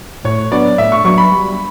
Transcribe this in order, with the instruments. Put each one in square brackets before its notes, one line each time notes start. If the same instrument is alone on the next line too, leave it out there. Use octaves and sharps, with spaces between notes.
[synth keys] A2 [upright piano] C#5
[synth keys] F#3 B3 D4 [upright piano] D5
[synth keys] A2 [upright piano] E5
[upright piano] C#6
[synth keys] F#3 B3 D4 [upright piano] C#6
[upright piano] B5
[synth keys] G3